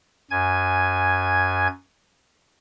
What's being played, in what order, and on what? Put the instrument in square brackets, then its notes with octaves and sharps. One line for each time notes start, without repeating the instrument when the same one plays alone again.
[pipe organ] F#2 G#5 G#6